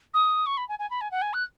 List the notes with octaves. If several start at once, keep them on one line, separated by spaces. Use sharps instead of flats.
D#6
C#6
B5
G#5
G#5
B5
G#5
F#5
G#5
F#6